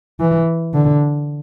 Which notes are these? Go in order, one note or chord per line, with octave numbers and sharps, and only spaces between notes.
E3
D3